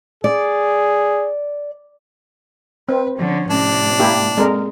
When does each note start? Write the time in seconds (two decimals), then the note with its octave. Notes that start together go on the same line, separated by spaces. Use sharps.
0.24 G#4 D5
2.89 C4 B4
3.19 D3 F3 C#4
3.50 A2 C3 C#4 D4
3.99 A#3 E4 G4
4.37 G#3 C4 A4 A#4 D5